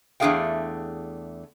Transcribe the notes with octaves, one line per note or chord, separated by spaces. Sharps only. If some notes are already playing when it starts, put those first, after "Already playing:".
E2 A3 D4 G#4 F5 G5